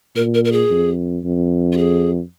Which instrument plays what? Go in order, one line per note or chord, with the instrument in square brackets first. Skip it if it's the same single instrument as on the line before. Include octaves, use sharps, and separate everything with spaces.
[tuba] A#2 [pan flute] A#4
[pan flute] A#4
A#4
G#4
[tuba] F2
F2
[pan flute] F4
G#4